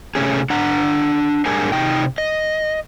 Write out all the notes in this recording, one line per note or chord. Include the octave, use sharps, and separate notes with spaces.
C3 A3 C#4 G#4
D4 F#5 A#5
G#2 G3 D4 G#4 A#4 G#5
C3 D#4 G5
D#5